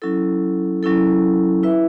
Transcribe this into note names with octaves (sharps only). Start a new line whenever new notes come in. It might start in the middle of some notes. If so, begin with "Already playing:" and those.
F#3 C#4 E4 A4
F#3 C#4 E4 A4
E4 B4 E5